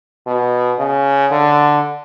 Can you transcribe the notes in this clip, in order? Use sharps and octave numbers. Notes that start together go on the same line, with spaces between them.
B2
C#3
D3